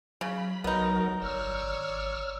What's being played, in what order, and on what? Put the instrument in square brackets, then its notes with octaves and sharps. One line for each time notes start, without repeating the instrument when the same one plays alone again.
[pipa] C#3 [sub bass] F#3 [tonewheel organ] B5
[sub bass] B1 [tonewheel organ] F#3 A#4 [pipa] B3 D#4
[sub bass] G1 [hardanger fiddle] C#5 D5 [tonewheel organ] E6 F6
[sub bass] G#1